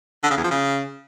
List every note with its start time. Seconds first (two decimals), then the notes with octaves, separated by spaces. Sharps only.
0.23 D3
0.30 C#3
0.37 E2
0.44 F3
0.51 C#3